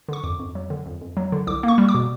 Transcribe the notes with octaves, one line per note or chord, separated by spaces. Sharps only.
D3 C#6
F2 D6
F2
F#3
D3
F2
F2
F#3
D3
C2 D6
A#3 C#6
G3
D6
B2